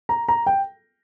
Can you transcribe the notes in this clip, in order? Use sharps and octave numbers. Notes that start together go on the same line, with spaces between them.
A#5
A#5
G5